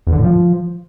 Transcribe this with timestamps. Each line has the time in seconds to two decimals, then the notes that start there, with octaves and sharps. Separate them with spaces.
0.07 E2
0.12 D3
0.18 A2
0.24 F3